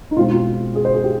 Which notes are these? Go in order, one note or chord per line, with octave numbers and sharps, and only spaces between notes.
D#4
B2 G#3 C4 F4
F4
G#4
C5
G#4
G4